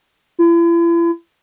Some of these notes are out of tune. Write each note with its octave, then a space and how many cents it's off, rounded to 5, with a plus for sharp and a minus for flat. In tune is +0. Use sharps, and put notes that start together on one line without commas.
E4 +40